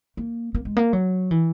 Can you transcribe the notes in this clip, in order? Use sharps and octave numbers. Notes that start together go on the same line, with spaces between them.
A#3
A#3
G#3
A#3
F#3
E3